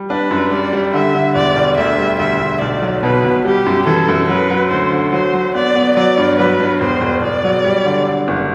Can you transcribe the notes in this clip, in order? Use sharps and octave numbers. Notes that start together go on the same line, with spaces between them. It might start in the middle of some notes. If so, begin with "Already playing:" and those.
Already playing: G3
D4 B4
F#2
G3 D5
G3
D3 E5
D3
E1 D5
E1
D2 E5
G3
D2 E5
D2
B1 D5
F#3
B2 B4
B2
G3 G4
F#2
E3 A4
F#2
F#3 B4
F#3
D2 C5
D3
F#3 C5
F#3
B3 D5
B3
F#3 D5
G2
F#3 B4
G2
E1 C5
E1
E1 D5
F#3
G3
D3
D3
F#1